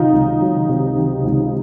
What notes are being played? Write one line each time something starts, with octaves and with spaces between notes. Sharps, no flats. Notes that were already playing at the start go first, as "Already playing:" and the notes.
Already playing: C3 D#3 F#3 D#4 F4
C#2
F#3
C3
D#3
C#2